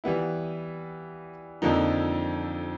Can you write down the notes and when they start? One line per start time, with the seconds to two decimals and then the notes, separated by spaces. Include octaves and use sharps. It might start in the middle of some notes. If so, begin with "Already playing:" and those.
0.04 E3 G3 B3 E4
1.62 F2 D3 F3 A#3 D#4